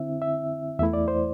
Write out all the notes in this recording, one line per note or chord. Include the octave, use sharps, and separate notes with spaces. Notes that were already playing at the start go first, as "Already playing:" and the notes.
Already playing: D3 C4 E4 E5
E5
E2 E3 A3 E4 E5
D5
C5